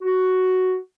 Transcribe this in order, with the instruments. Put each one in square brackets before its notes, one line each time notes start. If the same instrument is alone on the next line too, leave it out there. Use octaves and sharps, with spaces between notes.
[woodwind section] F#4